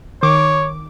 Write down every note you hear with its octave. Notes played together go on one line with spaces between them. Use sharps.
D#3 C#5 D6